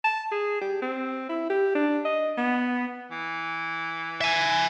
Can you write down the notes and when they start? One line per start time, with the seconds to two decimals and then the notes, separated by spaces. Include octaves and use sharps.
0.04 A5
0.32 G#4
0.61 G4
0.82 C4
1.29 E4
1.50 G4
1.75 D4
2.05 D#5
2.38 B3
3.11 E3
4.21 E5 G#5